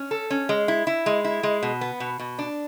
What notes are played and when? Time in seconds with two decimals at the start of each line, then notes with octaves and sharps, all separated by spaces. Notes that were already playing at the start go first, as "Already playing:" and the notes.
Already playing: C#4
0.11 A4
0.30 C#4
0.49 G#3
0.68 E4
0.87 E4
1.06 G#3
1.24 E4
1.43 G#3
1.63 B2
1.81 B3
2.00 B2
2.20 B2
2.39 D4